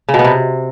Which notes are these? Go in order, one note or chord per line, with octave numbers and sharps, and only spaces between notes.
C#3
B2
B3
C3